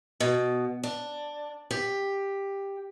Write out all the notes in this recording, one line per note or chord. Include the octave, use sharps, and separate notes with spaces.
B2
D4
G4